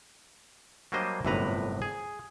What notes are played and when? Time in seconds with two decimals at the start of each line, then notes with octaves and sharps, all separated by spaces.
0.92 F#3 G3 A#3 D4 C5 D#5
1.25 G1 F#2 A2 C3 B4 A#5
1.82 G#4